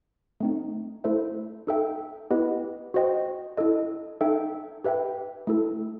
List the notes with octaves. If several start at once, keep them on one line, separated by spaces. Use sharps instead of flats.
A3 C4 D#4
A3 E4 A4 C5 E5
D#4 A4 E5 G5
B3 E4 G4 B4 D#5
F#4 C5 D#5 G5
E4 A4 D#5
D#4 A4 E5 G5
G4 B4 E5 G5
A3 E4 A4